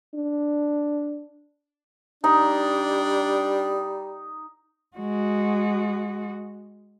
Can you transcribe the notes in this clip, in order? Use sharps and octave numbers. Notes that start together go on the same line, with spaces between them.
D4
G3 D4 D#4
G#3 F#4